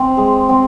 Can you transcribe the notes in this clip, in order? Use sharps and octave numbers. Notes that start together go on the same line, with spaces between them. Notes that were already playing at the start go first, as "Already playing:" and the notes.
Already playing: C4
G#3
C4